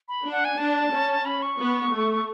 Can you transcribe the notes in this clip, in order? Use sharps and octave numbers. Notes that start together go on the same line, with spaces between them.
B5
D4
F#5
G#5
D4 A5
C#4
B5
C#6
B3
A3